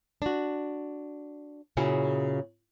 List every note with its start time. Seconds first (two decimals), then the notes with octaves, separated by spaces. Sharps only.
0.22 D4 F#4
1.77 A#2 C#3 C#4 E4 F#4 G#4